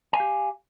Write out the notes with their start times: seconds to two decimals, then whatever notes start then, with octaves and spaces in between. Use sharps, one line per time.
0.13 G#5
0.17 F5
0.20 G4